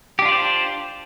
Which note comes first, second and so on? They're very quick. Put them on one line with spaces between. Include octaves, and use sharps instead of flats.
G4 D4 F4 D5 C5